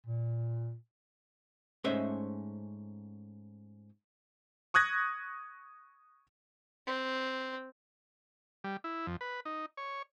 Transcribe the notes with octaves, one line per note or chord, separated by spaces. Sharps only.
A#2
G#2 A3 C#4 C5 D#5 E5
C#6 D#6 F#6 G#6 A#6
C4
G3
E4
F2
B4
D#4
C#5